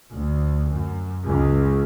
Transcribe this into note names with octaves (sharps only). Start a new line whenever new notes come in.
D2
F#2
C#2